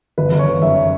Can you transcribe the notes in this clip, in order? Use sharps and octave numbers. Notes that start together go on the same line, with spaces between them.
G1 B4
G1
C#5
G1
F#2 E5